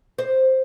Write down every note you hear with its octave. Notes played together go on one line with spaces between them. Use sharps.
C5